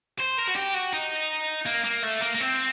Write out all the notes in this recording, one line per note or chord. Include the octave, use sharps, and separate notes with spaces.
C5
A#4
F#4
G4
F#4
D#4
A#3
A#3
A3
A#3
A#3
C4